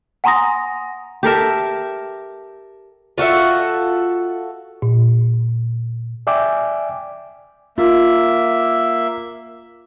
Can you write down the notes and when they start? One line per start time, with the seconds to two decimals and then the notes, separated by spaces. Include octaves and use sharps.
0.24 F#5 G#5 A#5 C6 D#6 A#6
1.23 G4 A4 A#4 E5
3.18 F4 F#4 A4 E5
4.82 A#2
6.27 D5 E5 G5 G#5 D6
7.78 A#3 F4 E5